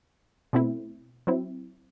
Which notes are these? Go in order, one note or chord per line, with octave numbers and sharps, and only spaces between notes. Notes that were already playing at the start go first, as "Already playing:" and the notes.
B2 A3 C4 E4
F#3 C4 E4